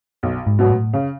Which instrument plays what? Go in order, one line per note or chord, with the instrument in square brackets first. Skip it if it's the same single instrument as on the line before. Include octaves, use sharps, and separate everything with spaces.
[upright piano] B1
[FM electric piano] G#2
[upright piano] B2 F#3 B3
[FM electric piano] A2
[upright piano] C#3